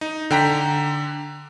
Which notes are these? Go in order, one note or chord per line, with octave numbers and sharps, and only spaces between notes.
D#4
D3 G5 A#5 B6